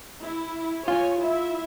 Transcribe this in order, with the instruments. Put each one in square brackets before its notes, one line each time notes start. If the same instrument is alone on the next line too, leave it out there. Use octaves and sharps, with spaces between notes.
[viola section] E4
[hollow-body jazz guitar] F4 [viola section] C#5 G#5
[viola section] E4 E5